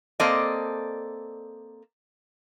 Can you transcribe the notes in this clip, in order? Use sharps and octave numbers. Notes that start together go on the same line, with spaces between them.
A#3 C4 A4 D5 D#5